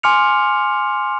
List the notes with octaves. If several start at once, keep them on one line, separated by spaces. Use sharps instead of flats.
G#5 C6 D6 F6 C#7 F7